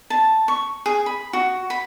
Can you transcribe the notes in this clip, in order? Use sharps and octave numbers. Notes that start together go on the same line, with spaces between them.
A5
C#6
G#4
B5
F#4
B5